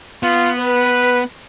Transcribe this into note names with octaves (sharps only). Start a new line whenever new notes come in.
B3 F4
B4